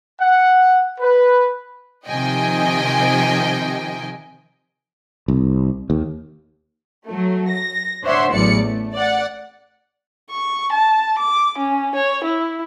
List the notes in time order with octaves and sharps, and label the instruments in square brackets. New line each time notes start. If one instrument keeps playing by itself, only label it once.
[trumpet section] F#5
B4
[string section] C3 D#3 F3 D#5 G5 G#5
[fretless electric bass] C2
D#2
[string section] F#3 A3
A#6
D4 C5 C#5 E5 F#5 C6
A1 E2 A2 F#3 D5 C#7
A3
D5 F#5
[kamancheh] C#6
A5
D6
C#4
C#5
E4